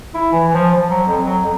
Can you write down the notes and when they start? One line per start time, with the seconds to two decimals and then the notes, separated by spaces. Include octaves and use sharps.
0.14 E4
0.32 E3
0.54 F3
0.74 F3
0.90 F#3
1.07 F2
1.24 F#3
1.44 F2